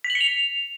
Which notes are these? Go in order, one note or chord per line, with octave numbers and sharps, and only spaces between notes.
B6
F#7
C#7
F7